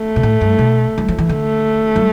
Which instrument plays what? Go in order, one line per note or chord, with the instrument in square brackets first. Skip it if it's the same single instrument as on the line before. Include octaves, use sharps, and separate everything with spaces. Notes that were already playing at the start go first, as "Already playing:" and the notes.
Already playing: [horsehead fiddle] A3
[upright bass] B2
A2
G2
B2
G3
F3
E3
[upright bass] D3 [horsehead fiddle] A3
[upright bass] G3